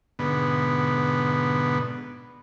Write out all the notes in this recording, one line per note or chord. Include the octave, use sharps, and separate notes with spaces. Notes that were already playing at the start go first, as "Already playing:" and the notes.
G#2 B2 D3 B3